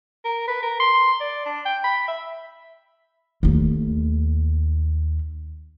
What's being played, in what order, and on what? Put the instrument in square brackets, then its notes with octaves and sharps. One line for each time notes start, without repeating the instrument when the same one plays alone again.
[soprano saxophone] A#4
B4
A#4
C6
D5
D4
G5
B5
E5
[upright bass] D#2 A3